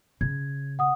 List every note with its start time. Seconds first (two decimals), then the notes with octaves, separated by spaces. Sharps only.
0.21 C#3 G#6
0.79 F#5 D#6